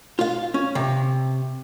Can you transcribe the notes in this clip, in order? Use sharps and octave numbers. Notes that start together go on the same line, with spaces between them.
F4 F5
C#4
C3